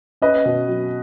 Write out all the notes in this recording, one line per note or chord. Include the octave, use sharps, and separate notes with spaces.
C#4 B4 D#5
B2
F#3